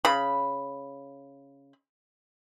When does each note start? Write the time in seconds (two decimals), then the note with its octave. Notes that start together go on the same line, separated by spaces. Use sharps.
0.05 C#3 B5